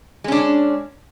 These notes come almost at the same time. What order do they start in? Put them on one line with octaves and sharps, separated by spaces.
G#3 C#4 D4